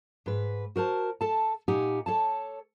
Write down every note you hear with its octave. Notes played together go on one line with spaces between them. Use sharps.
G#2 B4
F#4 A#4 C5 A5
A4 A5
A#2 D#4 G4 F#5 G#5
A4 C#5 A5